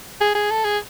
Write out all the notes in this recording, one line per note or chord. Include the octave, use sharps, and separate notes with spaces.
G#4
G#4
A4
G#4